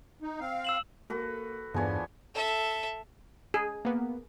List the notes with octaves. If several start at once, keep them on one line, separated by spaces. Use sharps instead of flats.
D#4
C4 F5
E6 E7 F#7
A#3 F#4 A4 B4
E2 G2 F3 B3 D4 C#5 G#5
A4 E5
G#4
A#3 B3